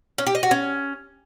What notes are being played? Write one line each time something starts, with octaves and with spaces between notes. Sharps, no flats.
C#4
G4
D#5
F#4
C#4